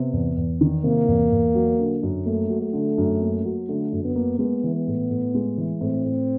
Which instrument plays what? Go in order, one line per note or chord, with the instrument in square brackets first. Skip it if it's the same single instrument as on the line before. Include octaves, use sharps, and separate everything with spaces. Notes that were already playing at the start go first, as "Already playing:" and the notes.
Already playing: [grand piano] C3 [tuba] B3
[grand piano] E2
E2
D#3
[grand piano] C3 [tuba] A#3
[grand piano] E2
E2
F#3
D3
F#2
[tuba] A3 [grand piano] A#3
[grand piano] F#3
[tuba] A3
[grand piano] D3
F#2
A#3
F#3
[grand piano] D3 [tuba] A3
[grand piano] F#2
[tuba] B3
[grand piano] A#3
[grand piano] G#3 [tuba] B3
[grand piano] E3
[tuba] B3
[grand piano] A2
A2
G#3
E3
[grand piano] A2 [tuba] C4
[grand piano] A2